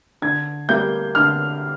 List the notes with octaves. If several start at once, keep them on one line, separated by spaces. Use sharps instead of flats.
D3 G#6
G3 A#3 G6
D3 F6